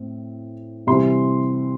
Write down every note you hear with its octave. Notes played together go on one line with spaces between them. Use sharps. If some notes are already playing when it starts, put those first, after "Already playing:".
Already playing: A2 C4
C3 E3 G3 C4 C6